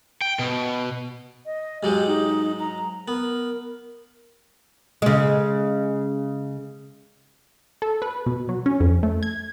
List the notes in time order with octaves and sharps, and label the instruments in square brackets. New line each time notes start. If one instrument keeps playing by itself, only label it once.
[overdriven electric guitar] G5
B2
[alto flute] D#5
[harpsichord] G#2 F#3 G#3 [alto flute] G4
[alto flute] D#4
A#5
[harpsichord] B3 [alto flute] A#4
[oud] C#3 G#3
[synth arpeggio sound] A4
B4
B2
F#3
C#4
F2
A3
G#6